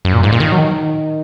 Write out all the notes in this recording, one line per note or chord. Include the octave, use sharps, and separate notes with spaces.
F#2
A#2
G#2
A#2
D#3
F#3
D#3